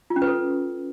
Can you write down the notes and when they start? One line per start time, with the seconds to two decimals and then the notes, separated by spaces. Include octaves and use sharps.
0.10 F4
0.16 C#4
0.22 B4
0.27 A4